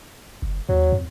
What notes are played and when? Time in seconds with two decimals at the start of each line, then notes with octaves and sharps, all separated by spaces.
0.42 F#1
0.69 D#2 F#3
0.92 F2